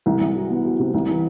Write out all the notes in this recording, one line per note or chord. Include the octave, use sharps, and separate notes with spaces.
C2
C2
F#3
B3
F#3
C3
C2
E3